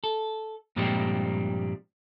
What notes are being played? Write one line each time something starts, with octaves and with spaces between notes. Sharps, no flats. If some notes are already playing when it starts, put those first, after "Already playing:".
A4
G2 A#2 F3 G3 G#3 C4